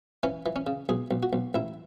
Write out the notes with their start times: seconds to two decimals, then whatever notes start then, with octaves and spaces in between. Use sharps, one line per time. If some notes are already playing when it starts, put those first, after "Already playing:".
0.23 E3 C#4
0.46 E3
0.56 C#4
0.67 C#3
0.89 B1 G#4
1.11 B1
1.23 F#4
1.33 B1
1.54 A1 E4